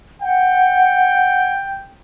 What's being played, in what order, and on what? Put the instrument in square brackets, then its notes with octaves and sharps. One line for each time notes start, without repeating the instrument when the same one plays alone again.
[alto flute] F#5 [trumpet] G5